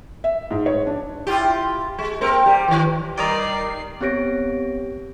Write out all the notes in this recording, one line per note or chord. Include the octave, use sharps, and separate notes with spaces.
E5
G#2
C#5
D4
E4 F4 G4
G#3
A#3 C4 A#4
G3 G4
D#3 E3
D#3 G3 D#4 A#4 D5 G5 A#5 C7
B3 C4 G4 C#5 A#6 D7